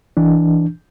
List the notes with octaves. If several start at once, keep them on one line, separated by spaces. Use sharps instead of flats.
E3 D4